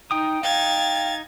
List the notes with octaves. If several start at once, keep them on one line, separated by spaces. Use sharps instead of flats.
D#4 G5 D#6
D#4 F5 G5 G#6 A6